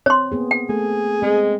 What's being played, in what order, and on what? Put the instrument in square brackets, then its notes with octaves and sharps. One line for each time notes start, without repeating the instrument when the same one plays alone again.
[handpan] C4 [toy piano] C#5 C6
[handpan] A#3 B3 G#4
[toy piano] G5
[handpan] A3 A4 [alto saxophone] G#4
[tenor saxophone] G#3 [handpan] C4